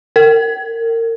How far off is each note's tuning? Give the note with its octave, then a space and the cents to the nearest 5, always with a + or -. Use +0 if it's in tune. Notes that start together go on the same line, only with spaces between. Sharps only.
A#4 -30